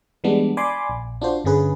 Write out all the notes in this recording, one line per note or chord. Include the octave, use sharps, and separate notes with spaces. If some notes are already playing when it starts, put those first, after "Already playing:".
E3 G3 G#3 B3 D4
D5 G#5 B5 C6 D6
A#1
D4 F4 F#4 C5
G1 D3 C#4 G#4 B4